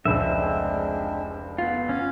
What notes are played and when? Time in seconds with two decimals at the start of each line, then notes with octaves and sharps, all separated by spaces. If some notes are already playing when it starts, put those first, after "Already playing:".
0.05 F1 C#2 G#3 C4 D4 D5 E5
1.58 B3 F4
1.89 C#4 F5